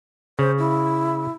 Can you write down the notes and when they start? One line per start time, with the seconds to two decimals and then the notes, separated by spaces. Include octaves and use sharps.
0.39 C#3 C5
0.58 E4